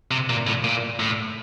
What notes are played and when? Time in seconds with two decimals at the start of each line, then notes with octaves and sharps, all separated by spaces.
0.11 C3
0.30 A#2
0.47 A2
0.64 A#2
1.00 A2